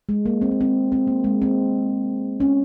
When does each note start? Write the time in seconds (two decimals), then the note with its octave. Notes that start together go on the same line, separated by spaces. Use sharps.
0.09 G#3
0.26 A#3
0.42 C4
0.51 A#3
0.61 C4
0.92 C4
1.07 A#3
1.24 G#3
1.42 C4
2.40 C#4